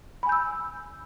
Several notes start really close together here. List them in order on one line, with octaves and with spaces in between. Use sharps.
B5 G#5 G6 E6